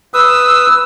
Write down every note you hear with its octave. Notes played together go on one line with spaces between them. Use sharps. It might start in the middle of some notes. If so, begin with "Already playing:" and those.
B4 D#6 E6